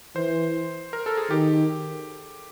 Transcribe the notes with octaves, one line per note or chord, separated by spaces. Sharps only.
E3 C5
A#4
A4
G#4
D#3 G4